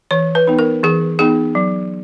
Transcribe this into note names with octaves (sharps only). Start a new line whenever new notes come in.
E3 C#5
B4
B3 D#4
A#4
E3 G#4
B3 D#4 G#4
F#3